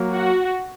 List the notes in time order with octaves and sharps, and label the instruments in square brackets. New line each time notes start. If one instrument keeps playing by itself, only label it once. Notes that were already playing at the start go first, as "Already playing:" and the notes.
Already playing: [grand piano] F#3 A#3
[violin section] F#4